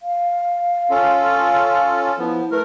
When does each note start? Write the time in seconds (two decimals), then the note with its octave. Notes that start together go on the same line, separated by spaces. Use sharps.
0.01 F5
0.90 C#4 F4 A4
2.18 F3 B3 E4
2.51 A3 A#4 B4